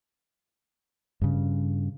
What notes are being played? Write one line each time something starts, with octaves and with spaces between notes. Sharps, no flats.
G2 C#3